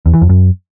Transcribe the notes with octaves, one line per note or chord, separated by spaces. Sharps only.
E2
E3
F2
F#2